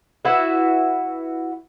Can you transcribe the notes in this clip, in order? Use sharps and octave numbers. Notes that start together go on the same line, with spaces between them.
E4 F#4 B4 E5